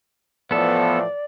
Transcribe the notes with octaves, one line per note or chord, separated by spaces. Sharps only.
A2 E3 F3 B3 A4 D5